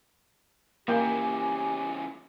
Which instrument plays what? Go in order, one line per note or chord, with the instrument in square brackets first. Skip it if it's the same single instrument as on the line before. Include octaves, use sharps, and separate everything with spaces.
[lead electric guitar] C#3 E3 [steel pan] A#3 G5 [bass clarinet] G4 [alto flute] G#5